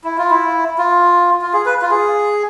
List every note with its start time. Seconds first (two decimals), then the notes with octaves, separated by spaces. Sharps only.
0.04 E4
0.18 F4
0.31 E4
0.78 F4
1.41 F4
1.54 G#4
1.66 B4
1.82 F4
1.91 G#4